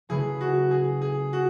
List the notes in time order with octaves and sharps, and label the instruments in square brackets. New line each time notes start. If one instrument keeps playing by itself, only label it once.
[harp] C#3 F#3 A3 E4 B4 [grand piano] G#4
[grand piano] F#4
G#4
G#4
F#4